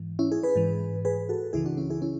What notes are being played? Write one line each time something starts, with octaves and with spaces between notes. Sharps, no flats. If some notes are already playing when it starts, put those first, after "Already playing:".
Already playing: G#2 E3
C#4 E4
E4 G#4
G#4 B4
G#2 E3
G#4 B4
F#4 A4
C#2 C#3 E3 E4 G#4
D4 F#4
C#4 E4
E4 G#4
C#4 E4